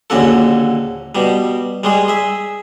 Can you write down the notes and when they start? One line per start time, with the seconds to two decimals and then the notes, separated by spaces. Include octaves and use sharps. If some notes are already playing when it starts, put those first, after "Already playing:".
0.10 A#1 D#2 D3 C#4 F#4 A4
1.15 B2 G3
1.84 G3 G#3 G#4
2.08 G#4 E5